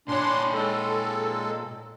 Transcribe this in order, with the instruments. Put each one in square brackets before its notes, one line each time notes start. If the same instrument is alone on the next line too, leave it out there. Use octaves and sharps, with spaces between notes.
[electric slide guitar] A#2 C#5 [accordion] D4 C6
[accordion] G#3 A4